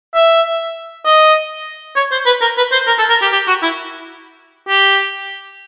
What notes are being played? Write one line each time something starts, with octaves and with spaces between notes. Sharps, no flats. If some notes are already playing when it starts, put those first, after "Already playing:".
E5
D#5
C#5
C5
B4
A#4
B4
C5
A#4
A4
A#4
G4
G4
F#4
E4
G4